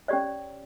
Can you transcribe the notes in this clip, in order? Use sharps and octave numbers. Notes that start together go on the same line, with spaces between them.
C#4 G4 C#5 D5